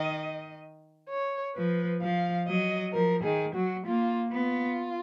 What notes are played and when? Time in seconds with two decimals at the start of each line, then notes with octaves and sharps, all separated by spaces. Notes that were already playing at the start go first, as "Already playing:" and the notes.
Already playing: D#3 D#5
1.09 C#5
1.55 F3 B4
2.01 F3 F5
2.47 F#3 D#5
2.93 F3 A#4
3.23 D#3 G#4
3.55 F#3 F#4
3.85 A#3 F4
4.31 B3 F4